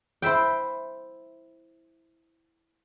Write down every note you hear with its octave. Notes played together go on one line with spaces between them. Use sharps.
E4 C5 E5 G5